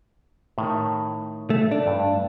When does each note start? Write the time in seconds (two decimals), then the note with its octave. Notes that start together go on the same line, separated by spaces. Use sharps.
0.58 A2 D#3
1.50 A3
1.71 D4
1.87 G2